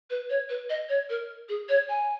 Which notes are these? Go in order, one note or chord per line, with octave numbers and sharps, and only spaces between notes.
B4
C#5
B4
D#5
C#5
A#4
G#4
C#5
G#5